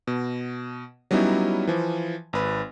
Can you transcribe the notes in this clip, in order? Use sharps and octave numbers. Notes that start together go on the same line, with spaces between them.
B2
F#3 G3 B3 C#4 D#4 E4
E3 F3
G#1 B4